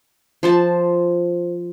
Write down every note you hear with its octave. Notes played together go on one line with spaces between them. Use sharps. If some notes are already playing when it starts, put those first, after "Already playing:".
F3 C5 A5